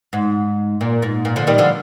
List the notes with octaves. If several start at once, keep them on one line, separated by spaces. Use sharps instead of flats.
G#2
A#2
G#2
A#2
D3 F3
D#3 G3
D3 F3